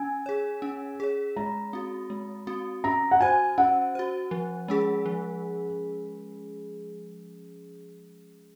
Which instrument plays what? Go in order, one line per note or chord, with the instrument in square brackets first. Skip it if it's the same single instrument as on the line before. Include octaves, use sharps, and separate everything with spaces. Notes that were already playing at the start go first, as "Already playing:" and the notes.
Already playing: [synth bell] C#4 [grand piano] G#5
[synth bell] G#4 C#5
C#4
G#4 C#5
[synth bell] G#3 [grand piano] A#5
[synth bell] C4 F#4
G#3
C4 F#4
[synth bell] C#4 [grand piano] A#5
[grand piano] F#5
[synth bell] F#4 C5 [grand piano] G#5
[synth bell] C#4 [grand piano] F#5
[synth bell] F#4 C5
F3
G#3 C#4 G#4
F3